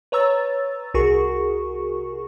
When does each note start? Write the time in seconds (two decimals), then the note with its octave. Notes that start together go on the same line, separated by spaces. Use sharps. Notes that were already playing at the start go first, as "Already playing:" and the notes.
0.12 B4 C#5 A#5 E6 A6
0.94 C2 F#4 G#4 A#4 C#6